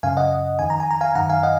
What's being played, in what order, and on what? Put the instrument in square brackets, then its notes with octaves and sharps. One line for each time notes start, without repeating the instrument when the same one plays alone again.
[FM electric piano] F#2 C#3 F5 G#5
D#5 F#5
F2 D#3 G#5
A#5
G#5
A#5
F5 G#5
F#2 D#3 F#5 A#5
F5 G#5
D#5 F#5